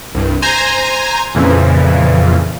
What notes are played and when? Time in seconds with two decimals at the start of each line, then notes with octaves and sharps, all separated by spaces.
0.15 C2 G2
0.42 C5 G#5 A#5
1.35 F2 A#2 C#3 E3 F3